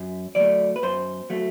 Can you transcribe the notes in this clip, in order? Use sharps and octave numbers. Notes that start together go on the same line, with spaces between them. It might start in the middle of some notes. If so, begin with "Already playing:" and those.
Already playing: F#2
F#3 A3 D5
B4
F#2 C5
F#3 A3